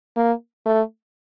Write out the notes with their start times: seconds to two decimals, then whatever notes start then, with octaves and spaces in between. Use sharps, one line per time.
0.16 A#3
0.66 A3